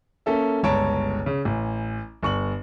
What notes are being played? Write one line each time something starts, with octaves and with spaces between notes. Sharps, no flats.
A#3 C#4 A4 E5
G1 C#2 C#5 A5 A#5 D7
C#3
A1
G1 C#6 F#7